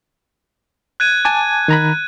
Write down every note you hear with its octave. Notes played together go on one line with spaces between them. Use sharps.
F#6 G#6 D#7
G#5 A5 D6
D#3 A#5 B5